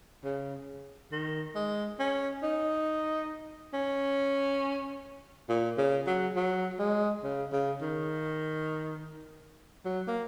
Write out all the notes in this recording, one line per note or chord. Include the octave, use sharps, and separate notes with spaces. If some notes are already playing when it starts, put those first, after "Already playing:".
C#3
D#3
G#3
C#4
D#4
C#4
A#2
C#3
F#3
F#3
G#3
C#3
C#3
D#3
F#3
A#3